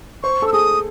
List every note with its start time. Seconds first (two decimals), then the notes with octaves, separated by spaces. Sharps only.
0.23 C5 C#6
0.42 A4
0.48 E6
0.53 G#4 D#6